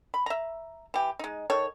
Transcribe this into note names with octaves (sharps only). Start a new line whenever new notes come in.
B5
E5 A#5
E3 G4
G#3 D#4
D#3 A4 C#5